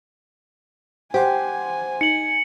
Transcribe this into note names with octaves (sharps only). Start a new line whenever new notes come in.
G4 C5 F#5 G#5 C6
D#4 C#7 F#7